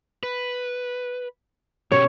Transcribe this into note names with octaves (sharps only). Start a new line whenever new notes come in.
B4
B2 C#4 G4 C#5